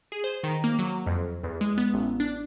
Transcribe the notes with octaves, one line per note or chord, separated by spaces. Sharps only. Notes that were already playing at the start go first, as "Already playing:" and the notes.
G#4
C5
D#3
A#3
F#3
F2
E2
G#3
B3
A1
D4